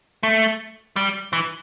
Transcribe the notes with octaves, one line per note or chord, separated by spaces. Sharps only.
A3
G3
E3